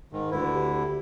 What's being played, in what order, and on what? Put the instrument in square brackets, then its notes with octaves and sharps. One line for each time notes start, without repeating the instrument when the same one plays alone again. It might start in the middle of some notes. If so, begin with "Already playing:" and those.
[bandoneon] G#2 D#3
[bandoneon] D2 D3 E4 [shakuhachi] B4
[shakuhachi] G4